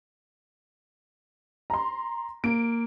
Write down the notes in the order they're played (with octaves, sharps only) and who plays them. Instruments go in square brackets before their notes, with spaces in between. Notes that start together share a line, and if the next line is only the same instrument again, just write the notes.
[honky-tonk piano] A#5 C6
[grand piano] A#3 [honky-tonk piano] D7